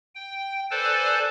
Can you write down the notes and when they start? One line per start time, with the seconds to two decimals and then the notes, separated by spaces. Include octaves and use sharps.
0.15 G5
0.71 A4 B4 C5 D5 G#5 A5